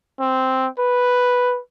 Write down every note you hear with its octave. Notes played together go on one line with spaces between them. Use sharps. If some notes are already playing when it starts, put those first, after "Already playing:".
C4
B4